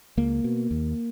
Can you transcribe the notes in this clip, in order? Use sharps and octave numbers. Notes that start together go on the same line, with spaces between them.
C#2 A#3
B2
D#2